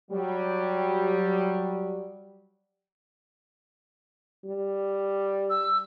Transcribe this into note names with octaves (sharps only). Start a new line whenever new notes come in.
F#3 G3
G3
E6